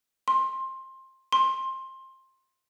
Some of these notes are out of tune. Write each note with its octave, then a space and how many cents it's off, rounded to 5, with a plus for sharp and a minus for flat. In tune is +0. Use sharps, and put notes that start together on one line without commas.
C6 +20
C6 +20